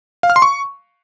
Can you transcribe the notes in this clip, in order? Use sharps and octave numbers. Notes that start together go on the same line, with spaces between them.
F5
F6
C6
C#6